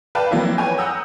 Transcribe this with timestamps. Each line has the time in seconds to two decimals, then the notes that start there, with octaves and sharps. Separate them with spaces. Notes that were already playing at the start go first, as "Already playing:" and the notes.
0.15 B4 D5 F5 G5 A5 B5
0.31 F3 F#3 A#3 C4 E4
0.58 B4 C#5 G5 G#5 A#5
0.78 F#5 A#5 D#6 E6 G6